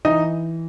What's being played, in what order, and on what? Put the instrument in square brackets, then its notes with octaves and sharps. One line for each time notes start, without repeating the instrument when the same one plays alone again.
[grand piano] E3 D#4 D#5